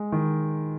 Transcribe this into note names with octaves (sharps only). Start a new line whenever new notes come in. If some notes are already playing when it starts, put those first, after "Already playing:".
Already playing: G#3
D#3